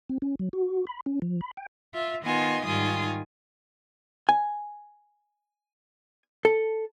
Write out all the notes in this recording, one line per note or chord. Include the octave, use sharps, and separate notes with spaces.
C4
C#4
F#3
F#4
B5
C#4
F3
B5
G5
F4 E5
D#3 B3 F4 D#5 G#5 C6
G#2 D#3 G3 F4 G#5 D#6
G#5
A4